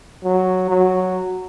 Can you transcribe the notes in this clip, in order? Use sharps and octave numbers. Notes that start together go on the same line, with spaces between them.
F#3
F#3